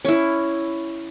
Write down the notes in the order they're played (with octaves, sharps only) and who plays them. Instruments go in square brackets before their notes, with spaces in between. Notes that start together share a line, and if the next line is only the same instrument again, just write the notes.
[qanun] C#4 E4